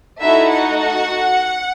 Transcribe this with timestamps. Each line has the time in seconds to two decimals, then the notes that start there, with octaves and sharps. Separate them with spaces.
0.21 A3 D#4 E4 F#4 A4 E5
0.52 F#4 F#5